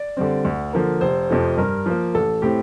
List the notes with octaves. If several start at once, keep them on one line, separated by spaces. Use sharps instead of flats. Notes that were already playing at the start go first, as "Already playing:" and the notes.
Already playing: D5
D3 G3 C4
D2
D3 F3 A#3
F1 C5
F2 C3 F3 A3
G2 A#4
F3 A#3
A1 A4
A2 A3 C4 G4